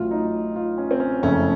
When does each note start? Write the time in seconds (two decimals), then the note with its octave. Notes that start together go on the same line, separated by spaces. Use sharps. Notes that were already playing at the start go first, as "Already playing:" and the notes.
Already playing: A1 A2 F#3 F4
0.11 D#4
0.56 F4
0.78 C#4
0.91 C4
1.00 C#4
1.23 F#1 F2 C#3 A3 C#4